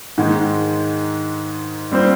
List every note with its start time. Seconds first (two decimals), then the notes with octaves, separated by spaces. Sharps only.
0.18 G#2 D#3 G#3
1.91 G3 C4 F4 C5